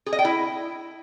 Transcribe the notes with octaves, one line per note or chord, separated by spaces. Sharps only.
G#4
D#5
G5
E4